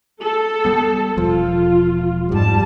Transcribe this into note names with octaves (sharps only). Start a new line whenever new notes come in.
A4
G3 B3
E1 F3 F4
F2 G#2 G3 A5